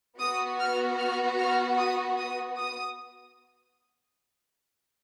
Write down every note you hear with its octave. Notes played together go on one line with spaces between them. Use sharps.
B3 F#4 D#6
F6
F6
F6
D#6
D#6
D#6